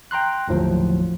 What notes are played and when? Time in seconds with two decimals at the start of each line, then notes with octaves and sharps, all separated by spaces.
0.11 G5 A#5 C6 F#6
0.48 G1 D#2 A2 F3 F#3